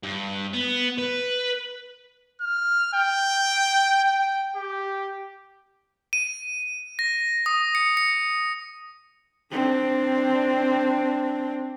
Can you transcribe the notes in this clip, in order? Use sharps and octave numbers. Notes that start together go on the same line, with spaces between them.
G2
B3
B4
F6
G5
G5
G4
D#7
A#6
D#6
C#7
C#7
C4 D4